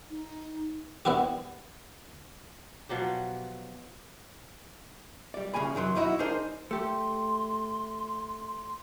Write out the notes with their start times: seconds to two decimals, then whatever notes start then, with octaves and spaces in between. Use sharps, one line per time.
0.10 D#4
1.05 B3 D4 E4 F#4 G4
2.89 B2 F3 F#3 G4
5.34 G3 D5
5.53 C2 C#3 F3 G#5 B5
5.75 F#2 D#3 F#3 C6
5.95 B1 F2 D#4 E4 F#4 D#5
6.19 D4 D#4 G#4 A#4 C5 D#5
6.71 A3 G4 C6